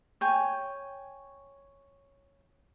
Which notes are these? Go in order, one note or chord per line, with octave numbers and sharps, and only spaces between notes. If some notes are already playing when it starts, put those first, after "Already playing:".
C#5 G5 G#5